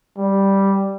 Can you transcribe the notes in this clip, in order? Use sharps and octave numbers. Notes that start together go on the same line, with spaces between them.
G3